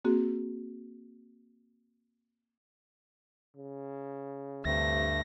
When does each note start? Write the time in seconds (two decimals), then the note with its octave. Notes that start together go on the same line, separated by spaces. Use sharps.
0.05 A#3 C4 F#4 G#4
3.57 C#3
4.65 D2 G2 C3 A3 A#6